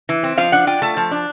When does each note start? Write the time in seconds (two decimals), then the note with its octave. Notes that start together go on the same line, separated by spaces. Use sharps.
0.09 E3
0.23 C4
0.38 F3 F5
0.52 D4 F#5
0.67 F4 G5
0.82 A3 A5
0.97 F3
1.11 D4